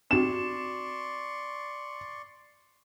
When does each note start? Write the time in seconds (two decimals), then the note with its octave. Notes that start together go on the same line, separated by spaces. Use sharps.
0.11 C4 F#4 D5 C6 C#6 E7